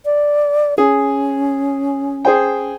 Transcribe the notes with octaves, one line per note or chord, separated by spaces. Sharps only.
D5
C#4 G#4
G#4 C5 G5